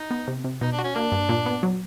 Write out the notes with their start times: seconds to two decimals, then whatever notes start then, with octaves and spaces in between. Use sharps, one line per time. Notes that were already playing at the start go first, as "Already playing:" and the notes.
Already playing: D#4
0.11 B3
0.28 C3
0.44 C3
0.61 B2 D#4
0.72 D4
0.79 F#4
0.84 C#4
0.95 A#3 D4
1.12 G2
1.29 A#2
1.46 B3
1.63 F#3